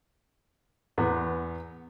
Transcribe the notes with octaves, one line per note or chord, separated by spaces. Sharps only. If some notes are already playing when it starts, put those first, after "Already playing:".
E2 B3